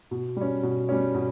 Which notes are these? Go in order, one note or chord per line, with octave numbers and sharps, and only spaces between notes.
B2
G3 C#4
B2
G3 C#4
B2